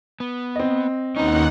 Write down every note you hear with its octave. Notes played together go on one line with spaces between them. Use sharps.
B3
C4 D#5
D#2 C#4 D#4 B4 F#5